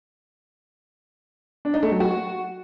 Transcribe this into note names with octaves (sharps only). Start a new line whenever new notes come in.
D4
D#4
A3
F#3
F#4